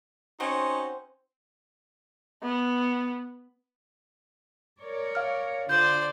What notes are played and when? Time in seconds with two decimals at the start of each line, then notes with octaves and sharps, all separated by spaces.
0.40 C4 C#4 D#4 F#4 C5
2.43 B3
4.82 A#4 C#5 D5
5.15 F5 F6
5.69 D3 F4 C5 D5 G6